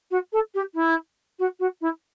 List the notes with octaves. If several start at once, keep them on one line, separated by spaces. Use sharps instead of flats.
F#4
A4
G4
E4
F#4
F#4
E4